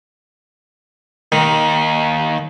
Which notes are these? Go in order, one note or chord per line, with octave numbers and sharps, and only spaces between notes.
D#2 D#3